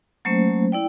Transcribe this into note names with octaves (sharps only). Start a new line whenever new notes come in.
F#3 A3 A#3 C#4 C5
E4 D5 G5